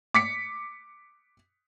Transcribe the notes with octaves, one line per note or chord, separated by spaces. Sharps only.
D6 B6 C#7